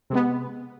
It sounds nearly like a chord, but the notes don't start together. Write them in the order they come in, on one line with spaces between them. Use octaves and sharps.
C3 G#3 B3